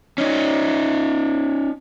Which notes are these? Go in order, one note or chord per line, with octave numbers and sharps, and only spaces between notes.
C#4 D#4